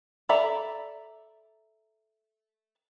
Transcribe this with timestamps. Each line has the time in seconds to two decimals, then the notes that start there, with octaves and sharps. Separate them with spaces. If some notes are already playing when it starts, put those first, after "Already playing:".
0.29 A4 D5 E5 A#5 B5